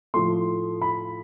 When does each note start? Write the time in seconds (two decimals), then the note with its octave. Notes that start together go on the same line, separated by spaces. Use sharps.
0.14 A2 F3 A3 C6
0.82 B5